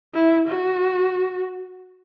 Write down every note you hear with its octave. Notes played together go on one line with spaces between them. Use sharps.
E4
F#4